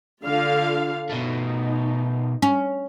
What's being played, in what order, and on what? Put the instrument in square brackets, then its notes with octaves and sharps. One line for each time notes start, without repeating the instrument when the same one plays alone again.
[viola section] D3 F4 F5
[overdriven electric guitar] B2 A3 [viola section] D#4
[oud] C#4